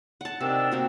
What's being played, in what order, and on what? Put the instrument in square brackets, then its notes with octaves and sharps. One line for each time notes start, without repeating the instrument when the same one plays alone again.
[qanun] F#5 A5
[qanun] C3 [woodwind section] D#3 D4 E6
[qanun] A#3 C4 F#4